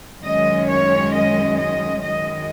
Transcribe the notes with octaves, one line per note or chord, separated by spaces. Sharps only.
F#2 D#3 G#3 C#4 D#5
C#5
D#5
D#5
F#2 D#3 G#3 D#5